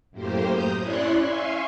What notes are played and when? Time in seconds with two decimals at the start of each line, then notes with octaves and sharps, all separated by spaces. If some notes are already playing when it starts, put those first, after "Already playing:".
0.11 F#2 A2 A#3 G4 C5
0.48 A#5 D#6 G6
0.78 C#4 E4 C#5 D5 C6 F#6
1.19 E5 F5 G#5 C6 C#6